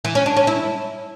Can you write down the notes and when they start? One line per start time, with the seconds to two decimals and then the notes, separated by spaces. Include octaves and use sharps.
0.05 E3
0.15 C#4
0.26 D4
0.37 C#4
0.47 E4